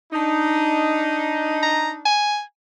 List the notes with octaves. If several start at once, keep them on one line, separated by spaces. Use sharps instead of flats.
D4 D#4
A#5
G#5